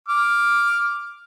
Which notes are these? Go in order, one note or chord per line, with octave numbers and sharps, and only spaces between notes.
D6 F6